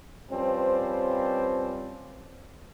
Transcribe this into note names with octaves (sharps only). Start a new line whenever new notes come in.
F3 G3 C4 C#4 B4 C5